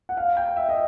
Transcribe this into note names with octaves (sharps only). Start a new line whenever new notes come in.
F#5
F5
G5
E5
D#5